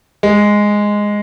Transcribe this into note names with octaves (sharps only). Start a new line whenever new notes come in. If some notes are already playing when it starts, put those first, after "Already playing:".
G#3